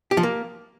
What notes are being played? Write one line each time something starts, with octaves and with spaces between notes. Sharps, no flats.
G4
F3
A#3